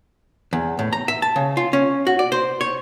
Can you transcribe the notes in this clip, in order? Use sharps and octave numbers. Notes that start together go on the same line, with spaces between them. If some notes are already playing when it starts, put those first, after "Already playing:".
E2
A2
A#5
E5
A5
C#3
F4
C#4
F#4
D5
C5
C#5